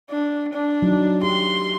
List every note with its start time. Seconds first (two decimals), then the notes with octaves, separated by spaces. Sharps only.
0.10 D4
0.53 D4
0.82 F#3 D#4
1.23 G4 C6